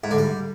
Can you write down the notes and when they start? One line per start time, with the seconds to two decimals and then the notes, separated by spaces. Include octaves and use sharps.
0.04 G#2
0.11 D3
0.18 G3